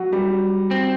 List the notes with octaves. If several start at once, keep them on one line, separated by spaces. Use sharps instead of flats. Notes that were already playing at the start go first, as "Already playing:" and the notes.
Already playing: F#3 F#4
G3 G4
C4